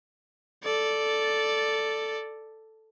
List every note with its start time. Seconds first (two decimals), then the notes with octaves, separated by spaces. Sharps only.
0.64 A4 D5